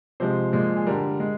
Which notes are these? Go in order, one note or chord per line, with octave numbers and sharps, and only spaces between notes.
C3 F3 G#3 C5
A#2 F3 G#3
G#4
D3 G3 A#4
G#3